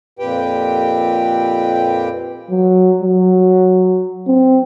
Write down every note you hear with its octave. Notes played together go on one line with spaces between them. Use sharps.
F2 A#2 G4 B4 G5
F#3
F#3
C4